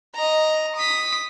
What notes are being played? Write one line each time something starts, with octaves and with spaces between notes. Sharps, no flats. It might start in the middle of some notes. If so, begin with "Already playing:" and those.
D#5 A#5
D#6 B6